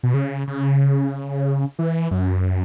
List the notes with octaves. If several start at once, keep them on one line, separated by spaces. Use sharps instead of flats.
B2
C#3
C#3
E3
F#2